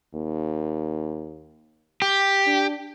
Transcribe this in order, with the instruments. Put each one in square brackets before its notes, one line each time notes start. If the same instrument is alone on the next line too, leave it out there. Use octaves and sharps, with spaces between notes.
[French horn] D#2
[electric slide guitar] G4
[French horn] D4